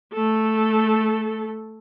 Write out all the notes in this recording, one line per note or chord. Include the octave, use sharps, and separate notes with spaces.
A3 A4